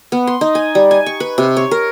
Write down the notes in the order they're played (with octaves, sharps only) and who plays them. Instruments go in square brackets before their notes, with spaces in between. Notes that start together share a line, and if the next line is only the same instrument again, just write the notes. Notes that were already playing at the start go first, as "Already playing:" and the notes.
[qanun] B3
C6
D#4
G#5
G3
G#5
C#6
B4
C3
C#5
A#4